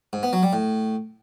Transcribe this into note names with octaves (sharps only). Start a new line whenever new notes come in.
G#2
B3
F#3
G3
A2